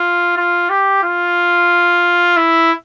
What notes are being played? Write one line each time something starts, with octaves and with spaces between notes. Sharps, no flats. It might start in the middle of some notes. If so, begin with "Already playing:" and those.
Already playing: F4
F4
G4
F4
E4